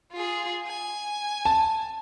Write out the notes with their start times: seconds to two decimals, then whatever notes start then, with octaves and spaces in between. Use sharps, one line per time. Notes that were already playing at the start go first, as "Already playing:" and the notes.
0.12 F4 G#4
0.67 G#5
1.45 A5